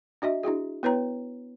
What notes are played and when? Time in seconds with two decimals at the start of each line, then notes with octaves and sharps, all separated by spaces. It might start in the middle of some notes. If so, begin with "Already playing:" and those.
0.22 D4 F#4 D#5 E5
0.43 D4 E4 F#4 G#4
0.83 B3 E4 B4 C#5 G5 A#5